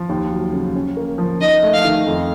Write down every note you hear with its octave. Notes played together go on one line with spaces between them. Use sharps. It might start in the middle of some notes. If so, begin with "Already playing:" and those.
Already playing: F3
D#2
F#3
C#3
C#4
A#3
F3
D#4 D#5
A3
F5
D#3
F2